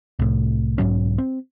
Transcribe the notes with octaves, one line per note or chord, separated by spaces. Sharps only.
C2 A2
B1 G#2 F#3 C#4
C4